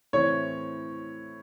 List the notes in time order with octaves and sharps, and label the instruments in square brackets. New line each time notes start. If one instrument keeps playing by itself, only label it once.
[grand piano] A2 E3 C4 C#5